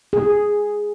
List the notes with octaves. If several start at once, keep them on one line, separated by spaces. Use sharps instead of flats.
G#4